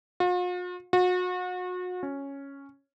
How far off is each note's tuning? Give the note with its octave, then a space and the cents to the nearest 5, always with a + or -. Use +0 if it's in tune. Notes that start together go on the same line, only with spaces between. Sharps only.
F4 +45
F#4 -35
C#4 +0